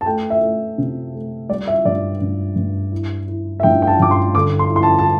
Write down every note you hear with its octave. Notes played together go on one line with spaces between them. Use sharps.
A5
A3 G5
E5
A3
C3
A3
G3 D5
E5
G2 D5
G2
G2
E4
E4
E5
G2 G5
G5
A5
G2 D6
C6
D3 D6
C6
E4
C6
A5
A5